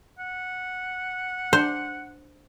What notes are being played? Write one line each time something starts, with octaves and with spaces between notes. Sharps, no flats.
F#5
D4 C5